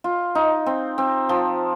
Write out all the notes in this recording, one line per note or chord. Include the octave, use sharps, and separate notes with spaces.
F4
D#4
C4
C4
F3